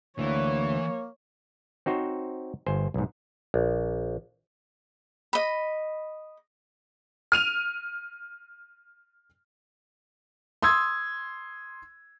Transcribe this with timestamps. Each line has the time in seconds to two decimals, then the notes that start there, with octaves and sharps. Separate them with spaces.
0.19 D2 E3 A#3 C#5
1.86 C4 D#4 F#4 C5 C#5
2.66 G1 C5 G#5
2.94 B1 G#2
3.54 A#1
5.33 D#5 B5
7.32 F6 D#7 F7
10.63 C6 D#6 E6 G#6